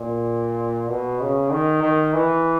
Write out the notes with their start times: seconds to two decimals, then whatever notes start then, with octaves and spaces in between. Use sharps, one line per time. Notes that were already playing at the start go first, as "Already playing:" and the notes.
Already playing: A#2
0.89 B2
1.20 C#3
1.51 D#3
1.82 D#3
2.14 E3